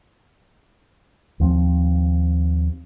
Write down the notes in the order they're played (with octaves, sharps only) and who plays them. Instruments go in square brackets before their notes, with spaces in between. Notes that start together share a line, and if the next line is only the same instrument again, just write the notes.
[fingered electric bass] D#2 F3 B3 C4